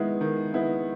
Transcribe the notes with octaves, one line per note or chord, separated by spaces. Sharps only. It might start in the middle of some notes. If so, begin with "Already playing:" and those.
Already playing: D#3 G#3 B3 E4
D#3
G#3 B3 E4